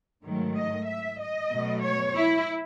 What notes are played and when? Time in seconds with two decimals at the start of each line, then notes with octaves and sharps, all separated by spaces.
0.23 G#2 D#3 F#3 A3
0.56 D#5
0.87 E5
1.20 D#5
1.52 B2 F#3 A3
1.83 C#5
2.16 E4